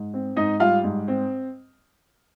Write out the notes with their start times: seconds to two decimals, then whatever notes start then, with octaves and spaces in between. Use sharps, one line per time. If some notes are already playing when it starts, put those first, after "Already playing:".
Already playing: G#2
0.14 C4
0.36 G#2 D#4 D#5
0.60 G3 F4 F5
0.84 G#2
1.08 C4